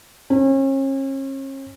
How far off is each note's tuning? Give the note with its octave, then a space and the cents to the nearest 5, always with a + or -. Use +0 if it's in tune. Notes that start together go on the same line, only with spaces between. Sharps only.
C#4 -40